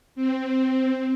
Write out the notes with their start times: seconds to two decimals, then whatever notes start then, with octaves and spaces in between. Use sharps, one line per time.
0.15 C4